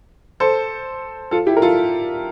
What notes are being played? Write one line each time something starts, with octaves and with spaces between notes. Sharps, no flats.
A4 C5
F4 A4
E4 G4
A#4
F4 A4